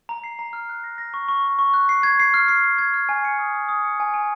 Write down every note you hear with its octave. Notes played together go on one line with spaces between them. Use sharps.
A#5
C7
A#5
F6
F#6
A#6
A#6
C#6
C#6
C#6
C#6
F#6
C7
G#6
C7
F6
C7
C7
G#6
F6
G#5
C#7
D#6
D#6
D#6
C#7
G#5
G#5